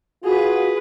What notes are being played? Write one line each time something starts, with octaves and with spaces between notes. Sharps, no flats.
F4 F#4 G#4 B4